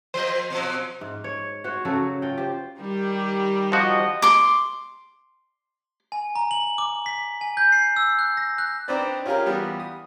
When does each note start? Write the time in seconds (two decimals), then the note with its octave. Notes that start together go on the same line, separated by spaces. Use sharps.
0.14 F3 A#3 C5 D#5
0.50 B2 F3 F#3
1.01 G#2
1.24 C#5
1.64 F#4 C5 C#5
1.85 C#3 F#3 F#4 A4
2.22 F4 G5
2.38 G4 C5
2.80 D#3 G3 G4
3.72 F3 F#4 D#5
4.22 C6 D6
6.12 G#5
6.35 A#5
6.51 F#7
6.78 D6
7.06 B6
7.41 G#5
7.57 G6
7.72 C7
7.96 E6
8.19 F#6
8.37 A#6
8.58 F#6
8.88 C4 D4 D#4 B4 C5 D5
9.26 C#4 F4 G4 G#4 A#4
9.46 E3 G3 B3 F4
9.80 D#6